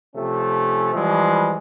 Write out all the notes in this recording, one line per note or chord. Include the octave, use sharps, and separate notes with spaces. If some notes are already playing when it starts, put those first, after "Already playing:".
C3 F3 A3 C#4
E3 F3 G3 G#3